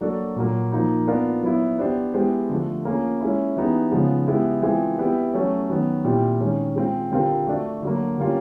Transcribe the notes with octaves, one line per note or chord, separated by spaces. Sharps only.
F#3 A#3 D4 F#4 A4
A#2 F#3 A#3
F3 A#3 D#4
B3 D4 F4 A#4
F#3 B3 E4
B3 D4 G4 C5
G#3 B3 E4 G4 C5
D3 F3 A3
A#3 C#4 F4 G#4
G#3 C#4 E4
E3 G3 B3 D#4 G#4
C#3 F3 G#3 B3
G#3 B3 E4 G4
E3 G#3 C4 F4 G#4
G3 B3 E4 G4 B4
F#3 A3 C#4
D#3 F#3 B3
A#2 G3 C4 E4 G4
D#3 G#3 C#4
G#3 C4 F4
D3 G3 C4 F4 A#4
A3 D4 F#4
D3 F#3 A#3
D3 G3 A#3 C#4 F4